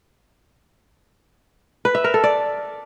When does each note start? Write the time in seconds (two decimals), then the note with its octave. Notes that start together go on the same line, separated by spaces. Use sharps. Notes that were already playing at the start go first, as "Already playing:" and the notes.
1.85 B4
1.95 E5
2.04 A#4
2.14 A4
2.24 D5